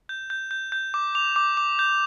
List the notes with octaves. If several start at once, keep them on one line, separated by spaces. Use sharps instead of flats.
G6
G6
G6
G6
D6
D6 F7
D6
D6
G6